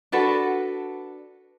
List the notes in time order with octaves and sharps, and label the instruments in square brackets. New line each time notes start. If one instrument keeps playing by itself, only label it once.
[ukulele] D4 F#4 A4 B4